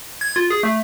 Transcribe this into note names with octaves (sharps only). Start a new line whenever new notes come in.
G#6
F4
G#4
A3